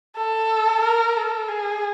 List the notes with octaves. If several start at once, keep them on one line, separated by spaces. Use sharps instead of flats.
A4
A#4
A4
G#4